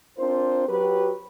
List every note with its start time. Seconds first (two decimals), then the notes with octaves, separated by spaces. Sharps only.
0.17 C4 D4 F4 A#4 C5
0.68 F#3 G4 B4